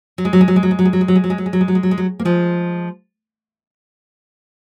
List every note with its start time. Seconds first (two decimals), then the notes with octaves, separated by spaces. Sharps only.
0.18 F#3
0.25 G#3
0.33 F#3
0.41 G#3
0.48 F#3
0.56 G#3
0.63 F#3
0.71 G#3
0.79 F#3
0.85 G#3
0.93 F#3
1.01 G#3
1.08 F#3
1.15 G#3
1.24 F#3
1.30 G#3
1.38 F#3
1.46 G#3
1.53 F#3
1.61 G#3
1.68 F#3
1.75 G#3
1.83 F#3
1.91 G#3
1.98 F#3
2.20 A#3
2.25 F3 G#3